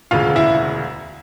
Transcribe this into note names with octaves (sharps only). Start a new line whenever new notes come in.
E1 D2 C#3 F4 F5
E4 E5